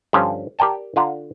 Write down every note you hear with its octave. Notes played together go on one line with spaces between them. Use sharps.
G2 D3 F3 C#4 F4
G4 A#4 D5 G5 A5
D3 F4 F#5 A#5